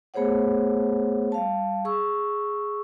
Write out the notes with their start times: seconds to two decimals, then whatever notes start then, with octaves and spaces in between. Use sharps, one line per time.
0.14 A3 B3 G#4 C5 C#5 F#5
1.32 G3 F5 A5
1.85 G#4 C#6 E6